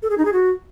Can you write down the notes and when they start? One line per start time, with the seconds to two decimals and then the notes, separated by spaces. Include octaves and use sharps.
0.02 A4
0.10 G#4
0.18 D#4
0.25 G#4
0.33 F#4